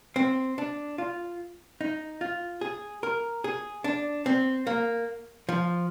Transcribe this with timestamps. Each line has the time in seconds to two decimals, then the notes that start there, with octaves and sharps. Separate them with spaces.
0.16 C4
0.58 D4
0.98 F4
1.81 D#4
2.21 F4
2.61 G#4
3.03 A#4
3.44 G#4
3.84 D4
4.26 C4
4.67 A#3
5.49 F3